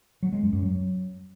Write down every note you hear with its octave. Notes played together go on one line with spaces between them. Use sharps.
F#3
G#3
F#2
F#2
F#3